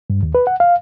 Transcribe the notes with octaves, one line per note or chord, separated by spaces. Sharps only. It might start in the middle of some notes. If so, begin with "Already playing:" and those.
G2
D#2
B4
F#5
F5